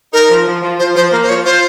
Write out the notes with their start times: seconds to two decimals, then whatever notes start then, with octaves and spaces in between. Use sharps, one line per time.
0.13 D#4 A#4
0.29 F3
0.47 F3
0.62 F3
0.79 F3 C5
0.96 F3 C5
1.12 A#3 A#4
1.22 C5
1.29 F3 C#5
1.45 F4 C5